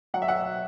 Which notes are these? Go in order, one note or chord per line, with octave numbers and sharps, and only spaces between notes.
F#3 F#5
E5
F#5